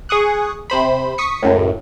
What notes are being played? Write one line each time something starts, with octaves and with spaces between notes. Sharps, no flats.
G#4 C#6 D#6 F#6
C3 C5 B5
C#6 D#6 B6 C#7
C#2 F#2 A2